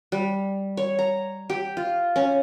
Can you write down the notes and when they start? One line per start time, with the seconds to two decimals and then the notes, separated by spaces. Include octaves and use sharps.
0.12 G3
0.77 C#5
0.99 A#5
1.50 G4
1.77 F4
2.16 C#4